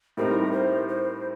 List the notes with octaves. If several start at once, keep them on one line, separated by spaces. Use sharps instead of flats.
A2 G3 C4 D#4 A#4
C5
C5